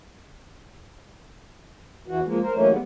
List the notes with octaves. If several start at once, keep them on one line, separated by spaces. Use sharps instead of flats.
E2 E3 F#4
F3 G#3 A#3
A#4 C5
D#3 E3 F#3 A3 A#3 C#4
G3 G#3 B3